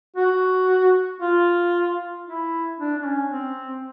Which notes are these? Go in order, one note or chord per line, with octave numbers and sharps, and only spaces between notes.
F#4
F4
E4
D4
D4
C#4
C4